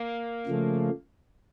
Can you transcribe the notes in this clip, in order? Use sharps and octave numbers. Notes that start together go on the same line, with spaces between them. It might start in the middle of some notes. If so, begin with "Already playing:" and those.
Already playing: A#3
C#3 F3 A3